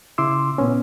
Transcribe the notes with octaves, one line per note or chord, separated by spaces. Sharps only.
C#3 E4 C6 D6 E6
A#2 B3 C#4